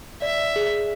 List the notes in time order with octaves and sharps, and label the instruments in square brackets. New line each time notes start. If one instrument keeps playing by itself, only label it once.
[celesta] D5 [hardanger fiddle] E5
[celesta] G#4